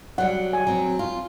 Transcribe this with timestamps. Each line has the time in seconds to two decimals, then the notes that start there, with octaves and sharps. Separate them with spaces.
0.18 F#3 G3 F#5
0.53 G#5
0.67 F#3 C4
0.99 F4